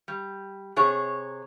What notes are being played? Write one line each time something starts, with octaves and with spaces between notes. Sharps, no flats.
G3
C3 G#4 C#5